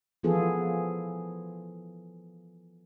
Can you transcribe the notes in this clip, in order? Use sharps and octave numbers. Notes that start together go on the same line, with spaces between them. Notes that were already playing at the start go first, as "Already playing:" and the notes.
E3 F3 B3 F4 G#4 A4